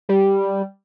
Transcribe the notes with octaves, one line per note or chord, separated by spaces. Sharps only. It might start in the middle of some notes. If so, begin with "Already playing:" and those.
G3